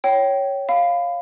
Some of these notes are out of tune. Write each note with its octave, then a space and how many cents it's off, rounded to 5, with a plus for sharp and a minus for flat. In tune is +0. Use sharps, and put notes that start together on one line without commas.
C#5 +0 G5 -20
F5 +0 B5 +25